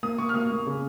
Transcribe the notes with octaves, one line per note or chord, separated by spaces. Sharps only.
A#3 D#6
A#3 C#6
F6
A#3 D#6
A#3
C#3